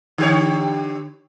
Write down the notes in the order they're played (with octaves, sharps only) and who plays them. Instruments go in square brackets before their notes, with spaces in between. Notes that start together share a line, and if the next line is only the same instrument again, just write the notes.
[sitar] D3 G4 C#5